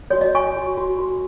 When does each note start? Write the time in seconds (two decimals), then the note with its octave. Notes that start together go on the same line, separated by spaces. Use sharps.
0.10 F#4 C#5
0.21 D#5
0.35 C#5 G#5 C#6
0.56 F#4
0.78 F#4
0.99 F#4